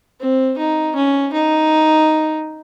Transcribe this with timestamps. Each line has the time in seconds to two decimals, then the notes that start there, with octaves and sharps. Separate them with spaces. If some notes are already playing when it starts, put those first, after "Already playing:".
0.20 C4
0.58 D#4
0.96 C#4
1.33 D#4